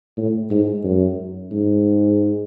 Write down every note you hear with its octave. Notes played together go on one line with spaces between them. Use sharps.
A2
G#2
F#2
G#2